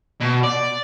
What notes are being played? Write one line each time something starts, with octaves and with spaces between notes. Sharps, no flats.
B2
D5